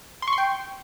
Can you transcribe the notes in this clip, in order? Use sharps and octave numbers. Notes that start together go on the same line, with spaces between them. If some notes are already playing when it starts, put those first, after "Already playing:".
C6
C#6
C6
G5